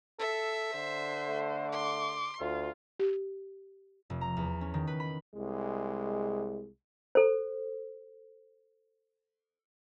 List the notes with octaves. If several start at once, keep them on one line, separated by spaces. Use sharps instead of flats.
A4 E5
D3 C5
A3
C6 D6
D2 F4
G4
F1
A#5
E2
C#4
D#3
B4
B5
C2 G#3
A4 C5